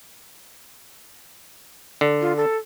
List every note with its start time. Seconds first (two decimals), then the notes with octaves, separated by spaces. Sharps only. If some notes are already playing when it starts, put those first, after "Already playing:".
2.01 D3
2.21 F4
2.37 A4